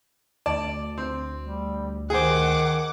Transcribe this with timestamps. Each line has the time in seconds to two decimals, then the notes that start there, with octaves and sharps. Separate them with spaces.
0.46 D2 D5 A5
0.98 C4
1.41 G3
2.10 D#3 G#4 C5 F#5 D6